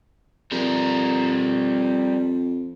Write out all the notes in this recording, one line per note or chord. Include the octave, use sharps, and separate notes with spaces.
F2 G3 A#4